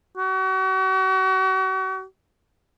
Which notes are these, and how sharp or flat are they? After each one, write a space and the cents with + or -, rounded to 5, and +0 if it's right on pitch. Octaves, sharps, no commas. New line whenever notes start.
F#4 +40